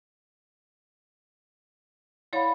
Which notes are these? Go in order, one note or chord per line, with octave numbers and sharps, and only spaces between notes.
E4 C#5 D5 F5 F#5 B5